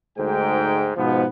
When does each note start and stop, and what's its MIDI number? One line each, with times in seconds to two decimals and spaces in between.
0.17 0.90 38
0.17 0.90 44
0.17 0.90 79
0.96 1.24 44
0.96 1.24 47
0.96 1.24 53
0.96 1.24 59